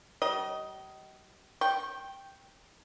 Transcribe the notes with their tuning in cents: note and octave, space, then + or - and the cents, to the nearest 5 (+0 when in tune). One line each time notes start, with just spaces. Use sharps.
G3 -40 D#5 +10
G5 +0 C#6 -45